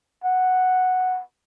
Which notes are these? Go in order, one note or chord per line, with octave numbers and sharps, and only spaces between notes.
F#5